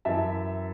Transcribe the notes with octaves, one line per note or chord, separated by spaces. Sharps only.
F#2 E3 E5 A5